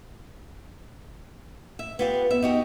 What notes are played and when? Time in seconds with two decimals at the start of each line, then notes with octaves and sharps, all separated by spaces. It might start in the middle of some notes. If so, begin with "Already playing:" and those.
1.79 E5
1.99 B3 F4 G4 B4
2.30 B3 E5
2.42 D#4 F#4 G4